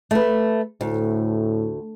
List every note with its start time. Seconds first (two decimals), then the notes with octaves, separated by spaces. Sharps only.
0.11 A3 B4
0.81 D2 A2